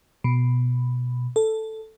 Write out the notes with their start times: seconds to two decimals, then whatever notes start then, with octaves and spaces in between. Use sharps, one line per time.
0.24 B2
1.36 A4